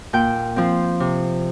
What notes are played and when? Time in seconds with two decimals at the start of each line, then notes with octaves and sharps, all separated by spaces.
0.13 A#2 G5
0.56 F3 C4
1.00 C3